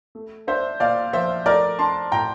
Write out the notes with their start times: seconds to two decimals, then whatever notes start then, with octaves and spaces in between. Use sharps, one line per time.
0.15 A3
0.47 D4 C5 E5
0.80 A#2 D5 F5
1.13 F3 C5 E5
1.46 A3 A#4 D5
1.79 D4 A5 C6
2.12 A2 G5 A#5